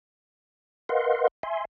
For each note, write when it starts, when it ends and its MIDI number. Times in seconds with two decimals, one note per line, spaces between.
0.89 1.28 70
0.89 1.28 71
0.89 1.28 75
0.89 1.28 77
0.89 1.28 78
0.89 1.28 84
1.43 1.65 76
1.43 1.65 80
1.43 1.65 84